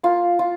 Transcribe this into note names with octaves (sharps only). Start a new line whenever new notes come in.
A#3 F4
F4